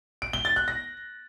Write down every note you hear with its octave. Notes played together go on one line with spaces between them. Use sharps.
D7
G7
A6
F#6
A#6